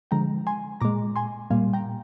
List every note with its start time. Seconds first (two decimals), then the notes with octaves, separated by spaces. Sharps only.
0.11 D3 F3 G#3 G5 A#5
0.47 G#5 C6
0.81 A#2 G#3 A#5 D6
1.16 G#5 C6
1.50 A#2 G3 A#3 F5 G#5
1.74 G5 A#5